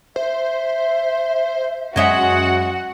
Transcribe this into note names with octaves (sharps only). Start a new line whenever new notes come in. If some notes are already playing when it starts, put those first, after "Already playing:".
C5 E5
F#2 F#3 G#3 F#4 E5 F#5